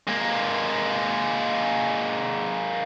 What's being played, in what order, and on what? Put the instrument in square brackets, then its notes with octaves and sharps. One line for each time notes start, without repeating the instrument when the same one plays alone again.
[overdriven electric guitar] G#3 A#3